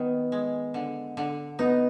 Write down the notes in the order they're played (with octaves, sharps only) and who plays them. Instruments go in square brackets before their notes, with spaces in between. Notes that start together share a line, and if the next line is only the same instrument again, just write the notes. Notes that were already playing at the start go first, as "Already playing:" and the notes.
Already playing: [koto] D#3 [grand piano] B3
[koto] G#3
D3
D3
[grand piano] B3 [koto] D#4